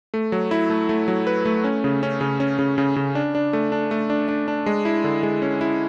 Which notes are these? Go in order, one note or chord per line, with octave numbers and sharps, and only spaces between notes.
A3
F#3
E4
A3
A3
F#3
B4
A3
C#4
C#3
C#4
C#3
C#4
C#3
C#3
C#3
D4
D4
A3
D4
A3
D4
D4
D4
G#3
E4
D3
G#3
C#4
E4